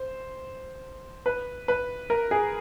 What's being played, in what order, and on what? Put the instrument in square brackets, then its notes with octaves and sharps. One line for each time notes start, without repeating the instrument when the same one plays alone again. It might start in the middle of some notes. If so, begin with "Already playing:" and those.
Already playing: [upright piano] C5
B4
B4
A#4
G#4